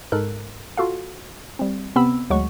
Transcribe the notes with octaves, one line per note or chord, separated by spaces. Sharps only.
G#2 G#3 A4 A#4 F#6
F4 F#4 A4 F5
G3 C4
C3 B3 C4 B5 E6
D2 F#3 G#3 F#5 C#6